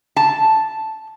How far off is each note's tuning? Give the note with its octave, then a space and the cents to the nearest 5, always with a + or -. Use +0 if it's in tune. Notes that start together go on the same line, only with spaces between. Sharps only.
A5 -5